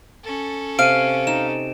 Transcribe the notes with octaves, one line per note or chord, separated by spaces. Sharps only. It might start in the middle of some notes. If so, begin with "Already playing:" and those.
C#4 A4
C3 F5 D7 D#7
D#4 E7